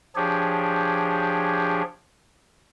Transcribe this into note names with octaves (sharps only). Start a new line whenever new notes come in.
F3 D4 G4 G#4 C#5